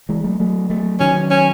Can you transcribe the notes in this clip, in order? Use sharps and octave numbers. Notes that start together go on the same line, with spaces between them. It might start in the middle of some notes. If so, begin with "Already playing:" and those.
E3 G#3
F#3 A3
F#3 A3
F#3 A3
D#3 F#3 C#4
C#4